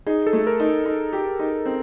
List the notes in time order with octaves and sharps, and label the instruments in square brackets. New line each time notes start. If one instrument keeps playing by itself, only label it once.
[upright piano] D#4 [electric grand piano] G#4
[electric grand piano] A4
[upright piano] A3
[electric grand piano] A#4
[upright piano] D#4
D#4
G4
D#4
C4